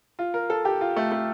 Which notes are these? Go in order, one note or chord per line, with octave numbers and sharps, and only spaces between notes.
F4
A#4
A4
G4
F4
A3
A3